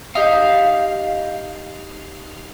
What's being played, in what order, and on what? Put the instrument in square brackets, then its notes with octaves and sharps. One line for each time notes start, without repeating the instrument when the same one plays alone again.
[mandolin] D#4 G4 [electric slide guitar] F5